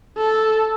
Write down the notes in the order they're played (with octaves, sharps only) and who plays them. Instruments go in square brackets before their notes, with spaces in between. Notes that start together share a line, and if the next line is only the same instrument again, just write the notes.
[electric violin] A4